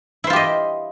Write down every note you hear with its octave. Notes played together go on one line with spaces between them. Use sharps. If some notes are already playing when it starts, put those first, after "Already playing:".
E4 F4 G4 C5 D#5